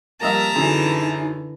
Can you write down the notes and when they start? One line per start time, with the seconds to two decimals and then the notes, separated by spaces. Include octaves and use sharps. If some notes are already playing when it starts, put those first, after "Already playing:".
0.21 F3 G3 A#3 A#4 D#5 E5 A5 A#5
0.55 F#2 D3 E3 D#4 G#4